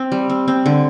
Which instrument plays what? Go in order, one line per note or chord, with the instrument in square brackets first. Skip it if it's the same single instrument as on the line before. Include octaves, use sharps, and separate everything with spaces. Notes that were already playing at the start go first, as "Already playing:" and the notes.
Already playing: [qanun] C4
G3
C4
C4
D3